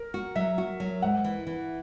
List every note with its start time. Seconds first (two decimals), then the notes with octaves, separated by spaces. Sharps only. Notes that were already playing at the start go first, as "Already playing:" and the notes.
Already playing: A#4
0.14 F#4
0.35 F#3 E5
0.58 F#4
0.80 F#3
1.02 G#2 F#5
1.24 E3
1.47 E3